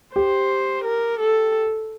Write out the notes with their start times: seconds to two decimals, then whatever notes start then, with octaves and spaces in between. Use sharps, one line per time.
0.15 G4 C5
0.85 A#4
1.20 A4